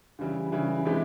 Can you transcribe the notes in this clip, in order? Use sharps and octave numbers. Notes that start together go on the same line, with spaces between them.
C#3 E3 G3
C#3 E3 G3
C3 E3 G#3 E4